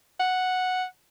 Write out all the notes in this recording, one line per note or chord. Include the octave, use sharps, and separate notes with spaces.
F#5